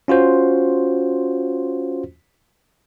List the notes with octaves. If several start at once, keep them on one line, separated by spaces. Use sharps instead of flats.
C#4 F4 F#4 C5